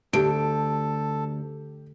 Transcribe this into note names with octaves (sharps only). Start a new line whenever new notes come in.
D2 G4 A4 D7